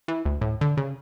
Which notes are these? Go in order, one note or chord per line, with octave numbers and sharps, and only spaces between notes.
E3
D2
A2
D3
C#3